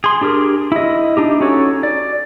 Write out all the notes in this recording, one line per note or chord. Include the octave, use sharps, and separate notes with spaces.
G#4 C6
D4 G4 G#4 A#4
E4 D#5
D4 D#4 G4
C#4 D#4 F#4 A4 C#5
D5